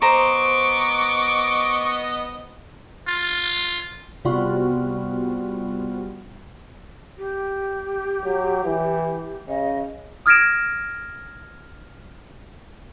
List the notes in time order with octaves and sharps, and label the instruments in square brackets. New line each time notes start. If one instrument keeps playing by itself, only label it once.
[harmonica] B3 D#5 [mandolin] C5 A#5 [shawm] C#6 [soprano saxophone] D6
[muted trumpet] F4
[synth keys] C3 G3 B3 F4 F#4
[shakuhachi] G4
[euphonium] F#3
E3
[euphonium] C#3 [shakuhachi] D#5
[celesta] D#6 F6 G#6 A#6 D7 E7